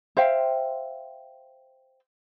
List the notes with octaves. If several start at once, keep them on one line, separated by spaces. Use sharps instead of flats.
C5 E5 F5 G5